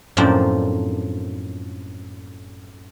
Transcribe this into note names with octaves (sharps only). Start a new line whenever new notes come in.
F#2 A2 F3 A#3 C4 D4